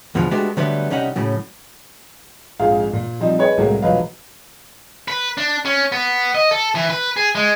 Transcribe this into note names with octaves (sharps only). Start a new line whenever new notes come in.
E2 B2 D3 F3
G#3 A3 B3 D4 F#4 G4
D3 F#3 G3 A3 B3 D4
C2 G3 C#4 D#4 F#5
A2 C#3 F#3
A#1 F2 G#2 G#4 F5
A#2
F3 G3 C4 D#4
G#4 B4 C#5 D#5
C2 A2 F#3 G#3 A#3
E1 A#1 F#3 B4 D#5 F5
B4
D4
C#4
B3
D#5
A4
E3
B4
G#4
G#3